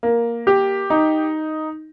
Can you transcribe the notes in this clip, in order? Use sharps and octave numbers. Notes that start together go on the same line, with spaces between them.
A#3
G4
D#4